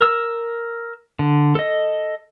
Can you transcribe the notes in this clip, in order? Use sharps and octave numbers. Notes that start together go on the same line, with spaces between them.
A#4 E6
D3
A4 D#5